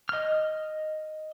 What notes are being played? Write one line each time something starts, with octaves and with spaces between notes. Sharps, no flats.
D#5 F6